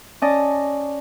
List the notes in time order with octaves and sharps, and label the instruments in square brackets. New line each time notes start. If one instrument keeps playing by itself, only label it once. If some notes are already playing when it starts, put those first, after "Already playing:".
[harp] C#4 D5 D#5 A5